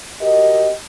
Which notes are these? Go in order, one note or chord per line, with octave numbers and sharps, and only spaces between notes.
F#4 G4 A#4 D#5